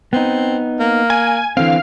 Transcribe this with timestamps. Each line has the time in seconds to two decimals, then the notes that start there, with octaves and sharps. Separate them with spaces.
0.13 B3 C4 D#4
0.79 A#3
1.10 G#5
1.57 D3 E3 C4 F5